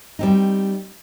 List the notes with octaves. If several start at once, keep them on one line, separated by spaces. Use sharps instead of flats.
G3 C4 D#4